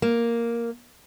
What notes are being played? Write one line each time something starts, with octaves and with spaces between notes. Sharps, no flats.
A#3